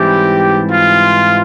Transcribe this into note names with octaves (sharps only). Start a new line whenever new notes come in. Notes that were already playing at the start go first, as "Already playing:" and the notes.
Already playing: G#2 E3 G3 C4 E4 G4
F4